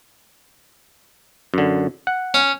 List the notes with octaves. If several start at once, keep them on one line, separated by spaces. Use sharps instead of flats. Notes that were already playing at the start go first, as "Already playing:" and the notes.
F#2 D3
F#5
C#4